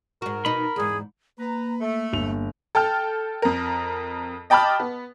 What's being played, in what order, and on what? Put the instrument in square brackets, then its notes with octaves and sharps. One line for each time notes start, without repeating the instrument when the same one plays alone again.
[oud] G#2 F#4 [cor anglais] A#4
[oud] B2 D#4 [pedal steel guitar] B5
[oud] E2 G#2 [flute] G#4
[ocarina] A#3 [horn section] B4 A#5
[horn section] A3
[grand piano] G1 F7
[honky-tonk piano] A4 G5 A5 F6
F2 A#4
D#5 G5 A5 B5 D6 F6
B3